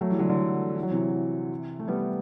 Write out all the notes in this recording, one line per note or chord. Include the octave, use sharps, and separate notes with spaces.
F#3 A3
E3 G3
D3 F#3
D3
E3
F#3
C3 E3
A3
G3 B3